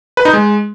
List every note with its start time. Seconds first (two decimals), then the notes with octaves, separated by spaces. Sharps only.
0.17 B4
0.25 D#4
0.33 G#3